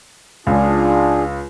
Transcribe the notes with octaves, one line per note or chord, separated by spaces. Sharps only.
C#2 D4 F4 G#4